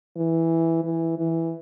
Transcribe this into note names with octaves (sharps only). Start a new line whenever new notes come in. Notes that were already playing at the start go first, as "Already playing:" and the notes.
E3
E3
E3